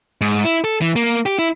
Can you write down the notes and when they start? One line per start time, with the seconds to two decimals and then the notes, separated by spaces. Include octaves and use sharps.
0.21 G#2
0.45 E4
0.64 A4
0.81 E3
0.96 A#3
1.26 G4
1.39 E4